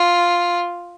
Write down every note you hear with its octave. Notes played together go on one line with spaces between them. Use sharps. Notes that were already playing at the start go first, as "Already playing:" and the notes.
Already playing: F4